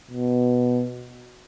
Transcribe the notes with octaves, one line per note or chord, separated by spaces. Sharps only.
B2